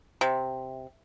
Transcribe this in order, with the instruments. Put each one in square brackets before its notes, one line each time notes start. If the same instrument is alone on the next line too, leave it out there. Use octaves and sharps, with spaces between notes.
[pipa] C3